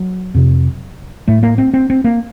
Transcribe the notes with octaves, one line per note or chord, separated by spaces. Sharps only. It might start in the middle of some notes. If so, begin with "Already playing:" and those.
Already playing: F#3
F2 C3
A2 A3
A#3
C4
C4
C4
A#3